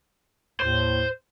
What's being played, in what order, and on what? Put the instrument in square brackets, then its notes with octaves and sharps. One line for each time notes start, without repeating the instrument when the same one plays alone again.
[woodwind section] D#2 A2 [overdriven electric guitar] C5